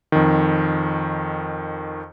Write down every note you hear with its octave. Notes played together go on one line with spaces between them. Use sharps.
F2 D#3